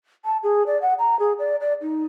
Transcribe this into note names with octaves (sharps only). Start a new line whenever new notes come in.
A5
G#4
D5
F#5
A#5
G#4
D5
D5
D#4